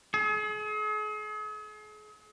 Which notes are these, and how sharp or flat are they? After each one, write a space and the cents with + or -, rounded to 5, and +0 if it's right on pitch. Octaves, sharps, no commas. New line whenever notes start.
G#4 +40